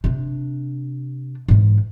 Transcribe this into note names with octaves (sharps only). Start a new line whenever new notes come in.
C3 D4
G#2 E3